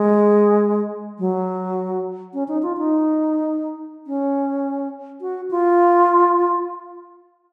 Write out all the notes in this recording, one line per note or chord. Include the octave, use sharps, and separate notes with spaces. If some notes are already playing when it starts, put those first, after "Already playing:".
Already playing: G#3
F#3
C#4
D#4
F4
D#4
C#4
F#4
F4